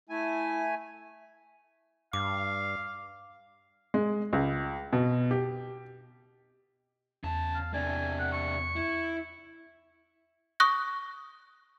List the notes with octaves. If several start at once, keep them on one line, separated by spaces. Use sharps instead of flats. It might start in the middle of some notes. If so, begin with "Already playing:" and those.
A3 E4 G#5
G2 F5 D6
G#3
C#2
B2
G4
E2 C#3 A5
F5
C3 D4 G#5
F#5
C#6
E4
C#6 D#6 F#6 A#6